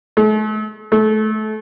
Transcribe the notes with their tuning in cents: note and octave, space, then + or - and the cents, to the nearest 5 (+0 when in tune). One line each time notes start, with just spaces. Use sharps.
A3 -40
A3 -25